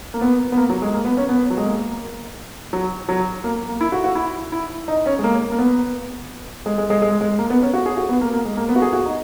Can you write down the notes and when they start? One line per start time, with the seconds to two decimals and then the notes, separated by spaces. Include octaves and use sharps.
0.14 A#3
0.21 B3
0.52 B3
0.57 A#3
0.70 F#3
0.82 G#3
0.94 A#3
1.05 B3
1.17 C#4
1.29 B3
1.50 F#3
1.57 G#3
1.66 A#3
2.73 F#3
3.09 F#3
3.44 A#3
3.69 A#3
3.81 E4
3.92 F#4
4.04 F#4
4.15 E4
4.52 E4
4.88 D#4
5.06 C#4
5.19 G#3
5.24 A#3
5.52 A#3
5.58 B3
6.66 G#3
6.78 G#3
6.90 G#3
7.02 G#3
7.21 G#3
7.39 A#3
7.50 B3
7.62 C#4
7.74 F#4
7.86 G#4
7.97 F#4
8.09 B3
8.21 A#3
8.33 A#3
8.45 G#3
8.57 A#3
8.69 B3
8.76 F#4
8.82 G#4
8.93 F#4
9.06 D#4